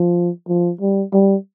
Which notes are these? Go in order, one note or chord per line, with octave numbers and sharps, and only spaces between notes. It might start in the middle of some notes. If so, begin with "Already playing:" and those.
Already playing: F3
F3
G3
G3